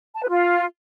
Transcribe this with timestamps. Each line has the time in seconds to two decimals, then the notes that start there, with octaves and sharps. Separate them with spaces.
0.16 A5
0.22 B4
0.29 F4